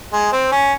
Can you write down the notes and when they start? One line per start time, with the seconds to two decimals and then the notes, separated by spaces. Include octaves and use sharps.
0.13 G#3
0.32 C4
0.52 C#4